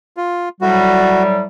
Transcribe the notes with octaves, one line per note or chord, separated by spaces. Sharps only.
F4
A2 F#3 G3 F#4